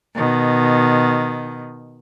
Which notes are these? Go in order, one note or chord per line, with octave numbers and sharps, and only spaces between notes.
B2 D#3